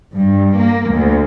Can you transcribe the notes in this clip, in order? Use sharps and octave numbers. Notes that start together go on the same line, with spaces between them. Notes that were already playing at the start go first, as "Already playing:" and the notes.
G2
A#3
D2